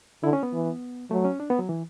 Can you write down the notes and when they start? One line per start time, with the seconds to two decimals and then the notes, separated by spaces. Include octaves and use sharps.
0.23 D3 E4
0.33 C#4
0.43 B3
0.53 E3
1.11 F#3 A3
1.25 C#4
1.40 D4
1.50 B3
1.59 F#3
1.69 E3